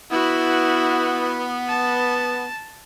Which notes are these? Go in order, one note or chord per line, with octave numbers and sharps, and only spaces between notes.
B3 E4 F#4
A5